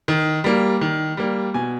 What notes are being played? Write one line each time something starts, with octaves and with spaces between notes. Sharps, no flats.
D#3
G3 A#3
D#3
G3 A#3
B2 G#5